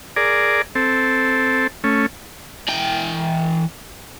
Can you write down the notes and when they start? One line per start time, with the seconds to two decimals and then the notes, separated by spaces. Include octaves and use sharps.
0.16 G#4 A#4 D5
0.75 C4 A4
1.84 A3 C#4
2.68 E3 G5